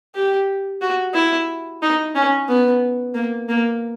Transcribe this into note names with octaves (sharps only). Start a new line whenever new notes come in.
G4
F#4
E4
D#4
C#4
B3
A#3
A#3